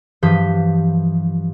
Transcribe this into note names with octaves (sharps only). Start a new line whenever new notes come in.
G2 E3 F3 D#6 G6 B6